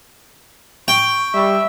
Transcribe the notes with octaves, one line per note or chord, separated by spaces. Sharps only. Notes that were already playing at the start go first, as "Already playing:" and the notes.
G5 C#6
G3 E5